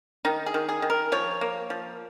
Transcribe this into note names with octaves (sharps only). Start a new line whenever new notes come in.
D#3 D#4
G#4
D#3
G#4
D#3
A#4
F3 C#5
A#3
F3